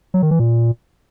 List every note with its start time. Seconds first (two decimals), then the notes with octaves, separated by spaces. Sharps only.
0.14 F#3
0.22 D#3
0.31 E3
0.40 A#2